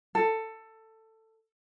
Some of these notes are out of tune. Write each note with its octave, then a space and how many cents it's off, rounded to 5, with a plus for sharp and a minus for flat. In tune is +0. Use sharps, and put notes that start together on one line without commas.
A4 +15